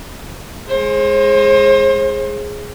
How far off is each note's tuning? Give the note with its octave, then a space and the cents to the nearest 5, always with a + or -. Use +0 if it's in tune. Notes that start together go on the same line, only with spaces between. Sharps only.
G#3 +0 C5 +40